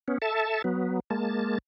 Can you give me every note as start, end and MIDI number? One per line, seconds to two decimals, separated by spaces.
0.08 0.18 59
0.08 0.18 61
0.22 0.62 69
0.22 0.62 76
0.22 0.62 81
0.64 1.00 54
0.64 1.00 59
1.10 1.58 56
1.10 1.58 58
1.10 1.58 81